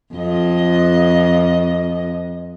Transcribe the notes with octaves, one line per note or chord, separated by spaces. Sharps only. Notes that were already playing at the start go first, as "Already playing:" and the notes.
F2 D#5